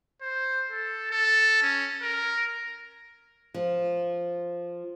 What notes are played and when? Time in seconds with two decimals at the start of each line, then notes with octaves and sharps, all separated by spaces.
0.21 C5
0.71 A4
1.11 A4
1.62 C#4
2.02 A#4
3.54 F3